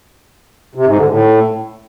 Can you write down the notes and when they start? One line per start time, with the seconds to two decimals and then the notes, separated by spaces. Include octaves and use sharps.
0.75 C3
0.86 G#2
0.97 D3
1.08 A2